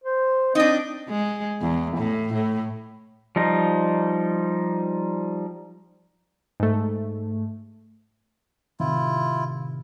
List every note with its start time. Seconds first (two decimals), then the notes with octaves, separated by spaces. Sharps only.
0.04 C5
0.55 C4 D4 D#4 D#5
1.09 G#3
1.61 E2
1.97 A2
2.34 A2
3.36 F3 G3 D#4
6.60 G#2 A3
8.80 A2 C3 D#3 E4 F4